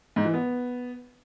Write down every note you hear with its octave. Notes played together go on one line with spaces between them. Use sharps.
G#2
E3
B3